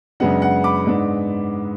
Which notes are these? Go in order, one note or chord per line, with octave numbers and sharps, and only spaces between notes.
F#2 C#3 G#3 B3 D4 F#5
F#5
B5 D6
G#2 G#3 B3 D4